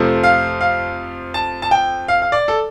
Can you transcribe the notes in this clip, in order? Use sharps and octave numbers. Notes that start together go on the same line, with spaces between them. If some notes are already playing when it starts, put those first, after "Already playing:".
Already playing: F2 C3 F3 A3
F5
F5
A5
A5
G5
F5
F5
D5
A4